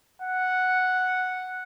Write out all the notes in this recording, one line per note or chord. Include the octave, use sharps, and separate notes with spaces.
F#5